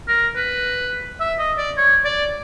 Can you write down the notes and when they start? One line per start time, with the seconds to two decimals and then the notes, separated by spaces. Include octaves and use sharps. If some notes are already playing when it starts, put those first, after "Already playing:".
0.08 A#4
0.36 B4
1.21 E5
1.39 D#5
1.58 D5
1.77 C#5
2.05 D5